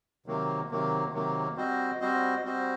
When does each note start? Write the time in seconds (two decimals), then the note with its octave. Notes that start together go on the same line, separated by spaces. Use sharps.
0.26 C3 D#3 F#3 A#3
0.69 C3 D#3 F#3 A#3
1.12 C3 D#3 F#3 A#3
1.56 G3 C4 F#4 C5 D#5
2.00 G3 C4 F#4 C5 D#5
2.43 G3 C4 F#4 C5 D#5